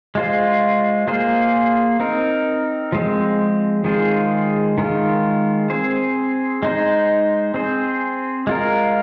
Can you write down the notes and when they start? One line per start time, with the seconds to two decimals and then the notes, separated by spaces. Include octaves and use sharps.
0.15 G#3 F4 C5
1.08 A#3 F4 G#4 C5
2.00 C4 D#4 A#4
2.92 F3 G#3 C4
3.84 D#3 G#3 F4 G#4 C5
4.78 D#3 G#3 F4
5.70 C4 G#4 C5
6.63 G#3 D#4 C5
7.54 C4 G#4 C5
8.47 G#3 F4 A#4